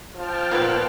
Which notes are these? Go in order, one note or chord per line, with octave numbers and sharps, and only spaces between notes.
F3 G5 A5 F6
A#2 A#3 B3 B4